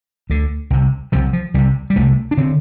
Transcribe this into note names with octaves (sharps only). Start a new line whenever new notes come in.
D2 D3
C2 C3
C2 C3 F3
F3
C2 C3 G3
G3
C2 C3 A3
D4
D3 C4